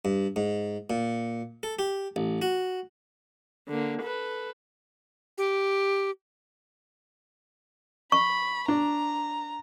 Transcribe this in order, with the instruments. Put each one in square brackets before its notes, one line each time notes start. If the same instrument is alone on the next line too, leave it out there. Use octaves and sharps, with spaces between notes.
[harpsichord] G2
G#2
A#2
A4
G4
A1
F#4
[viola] D3 A#3
A4 B4
[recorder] G4
[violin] B5 [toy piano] C#6
[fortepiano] D4 [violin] A#5